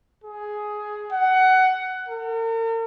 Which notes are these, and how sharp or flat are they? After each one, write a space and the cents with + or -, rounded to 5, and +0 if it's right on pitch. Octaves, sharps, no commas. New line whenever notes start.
G#4 +10
F#5 +15
A#4 -45